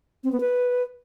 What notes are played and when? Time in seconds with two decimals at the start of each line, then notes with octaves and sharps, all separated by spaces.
0.24 C4
0.32 B3
0.40 B4